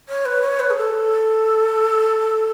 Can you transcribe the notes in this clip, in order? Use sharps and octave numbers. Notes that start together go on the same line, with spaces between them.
C#5
B4
C#5
B4
G#4
A4